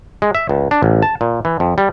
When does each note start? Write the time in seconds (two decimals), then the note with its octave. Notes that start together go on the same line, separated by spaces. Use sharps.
0.22 G#3
0.35 E5
0.49 C#2
0.71 D4
0.82 A1
1.02 A5
1.21 A#2
1.45 E3
1.60 F2
1.78 G3